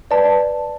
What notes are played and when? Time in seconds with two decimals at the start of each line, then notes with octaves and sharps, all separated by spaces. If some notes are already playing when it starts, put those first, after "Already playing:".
0.11 B4 D5 A5